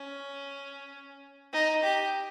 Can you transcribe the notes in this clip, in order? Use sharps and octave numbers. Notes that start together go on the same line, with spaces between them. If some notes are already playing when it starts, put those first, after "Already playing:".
Already playing: C#4
D#4
G4